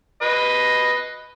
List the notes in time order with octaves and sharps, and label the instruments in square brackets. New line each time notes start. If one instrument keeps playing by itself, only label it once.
[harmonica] B4 D#5